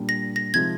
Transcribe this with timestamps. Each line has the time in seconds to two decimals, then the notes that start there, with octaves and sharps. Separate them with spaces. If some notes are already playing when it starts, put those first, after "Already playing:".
Already playing: A#2 G3 D4
0.09 A#6
0.36 A#6
0.54 C3 F3 G#3 D#4 G#6